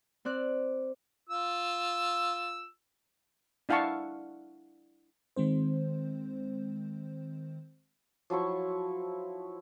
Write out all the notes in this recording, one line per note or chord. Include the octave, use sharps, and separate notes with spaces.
C4 D5 F#6
F4 E6
D4 E4 F5 F#5 A5 C#6
D#3 G#3 C4 C5
F3 F#3 E4 C#6